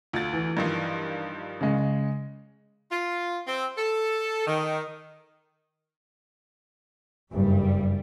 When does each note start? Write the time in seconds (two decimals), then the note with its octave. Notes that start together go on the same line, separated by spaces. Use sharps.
0.13 D2 F4 A6
0.33 E3
0.57 G2 D#3 F3
1.61 C#3 G#3
2.91 F4
3.47 C4
3.77 A4
4.47 D#3
7.32 F#1 G2 G3